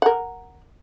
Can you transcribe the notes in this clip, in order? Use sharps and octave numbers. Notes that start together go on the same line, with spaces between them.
A#4 F#5